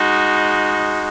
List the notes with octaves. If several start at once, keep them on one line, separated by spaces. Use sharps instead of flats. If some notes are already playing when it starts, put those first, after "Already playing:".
Already playing: G#3 D#4 F#4